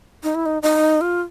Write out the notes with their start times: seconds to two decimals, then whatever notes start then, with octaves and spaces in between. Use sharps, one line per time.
0.23 D#4
0.35 E4
0.46 D#4
0.62 D#4
1.01 F4